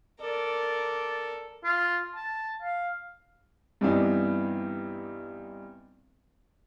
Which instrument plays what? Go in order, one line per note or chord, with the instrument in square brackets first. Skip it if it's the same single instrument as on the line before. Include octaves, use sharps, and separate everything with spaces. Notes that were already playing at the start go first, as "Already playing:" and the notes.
[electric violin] A4 [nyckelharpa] A#4 [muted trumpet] D5
[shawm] F4
A5
F5
[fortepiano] G2 E3 B3 C4 D4 D#4